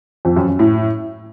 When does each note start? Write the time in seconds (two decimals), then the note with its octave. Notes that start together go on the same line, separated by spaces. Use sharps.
0.25 F2
0.36 F#2
0.48 F#2
0.59 A2